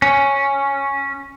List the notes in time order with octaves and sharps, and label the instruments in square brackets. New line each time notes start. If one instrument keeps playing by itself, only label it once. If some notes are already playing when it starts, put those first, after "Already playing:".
[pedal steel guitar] C#4